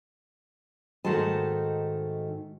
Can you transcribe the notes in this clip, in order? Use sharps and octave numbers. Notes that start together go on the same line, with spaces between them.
G#2 D#3 A3 F#4 C5 A5